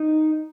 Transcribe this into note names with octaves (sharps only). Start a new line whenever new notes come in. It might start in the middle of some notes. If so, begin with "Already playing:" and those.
Already playing: D#4